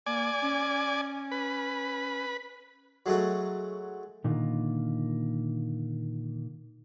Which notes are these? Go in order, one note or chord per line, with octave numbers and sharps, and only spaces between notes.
A#3 D5 G#5
C#4
B4
F#3 G#3 A3 F#4
A#2 D3 D#3 A#3 F4